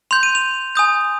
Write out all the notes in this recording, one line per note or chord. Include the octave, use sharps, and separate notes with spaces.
C6 G6 F7
D#7
F7
G#5 D#6 G6